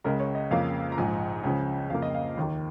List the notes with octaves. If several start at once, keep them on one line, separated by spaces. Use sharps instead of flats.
C#2 C#3 G#3 A#4
C#5
D#5
F2 C#3 A#3 F5
A#5
A#1 G#2 F3 G#5
C#2 C#3 F3 G#5
F2 C#3 A#3 F5
D#5
F5
D#2 D#3 A#3